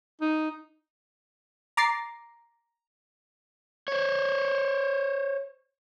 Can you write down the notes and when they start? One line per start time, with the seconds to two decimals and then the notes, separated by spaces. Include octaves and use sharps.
0.21 D#4
1.77 A#5 D6 A6 C7
3.88 C5 C#5